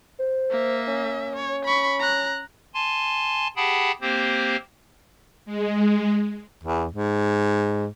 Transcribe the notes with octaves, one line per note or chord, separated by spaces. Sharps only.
C5
A#3 E5
C#4
C#5
B5 C#6
A#5 F#6
G#5 A5 C6
G4 G#4 F#5 G5 A5 B5
A#3 C4 G4 C5
G#3
E2
G#2